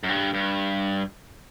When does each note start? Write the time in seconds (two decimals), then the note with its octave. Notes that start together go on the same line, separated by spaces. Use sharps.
0.03 F#2
0.09 G2
0.34 G2